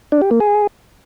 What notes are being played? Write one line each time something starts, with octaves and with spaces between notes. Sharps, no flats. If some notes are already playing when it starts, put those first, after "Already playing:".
D4
G4
A#3
G#4